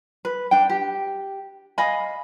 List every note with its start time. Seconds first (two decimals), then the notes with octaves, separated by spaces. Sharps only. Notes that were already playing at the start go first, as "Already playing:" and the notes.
0.25 B4
0.51 D4 G5
0.69 G4
1.78 D#5 F5 G#5 B5